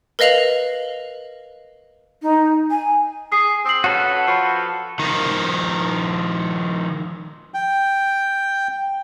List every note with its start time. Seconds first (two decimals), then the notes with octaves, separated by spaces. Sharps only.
0.19 A#4 B4 D#5 F5 F7 F#7
2.22 D#4
2.71 G#5
3.32 G#4 D#6 C7
3.65 C4 D#6 C7 F#7
3.84 C#4 F#4 A4 B4
4.27 F3 B5 C#6 C7
4.99 D#3 F3
7.54 G5